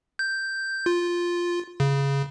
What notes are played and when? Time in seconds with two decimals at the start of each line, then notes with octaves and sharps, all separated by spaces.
0.19 G6
0.86 F4
1.80 C#3